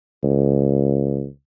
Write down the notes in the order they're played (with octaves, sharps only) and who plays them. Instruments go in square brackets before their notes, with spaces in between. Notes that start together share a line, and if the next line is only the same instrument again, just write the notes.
[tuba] C#2